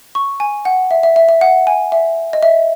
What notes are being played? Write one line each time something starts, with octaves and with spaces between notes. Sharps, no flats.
C#6
G#5
F#5
E5
E5
E5
E5
F#5
G#5
E5
D#5
E5